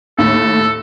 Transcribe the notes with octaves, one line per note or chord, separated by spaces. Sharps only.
D#2 A2 A4